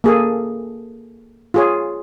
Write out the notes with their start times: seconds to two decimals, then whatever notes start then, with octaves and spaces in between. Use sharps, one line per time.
0.04 A#3 G#4 A4
1.54 F4 G#4 C#5